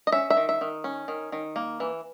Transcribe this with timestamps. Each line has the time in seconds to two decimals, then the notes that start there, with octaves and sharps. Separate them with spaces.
0.07 D#5
0.12 C#4 E5
0.30 E5
0.37 D#3
0.49 E5
0.61 D#3
0.84 C#4
1.08 D#3
1.32 D#3
1.56 A#3
1.80 E3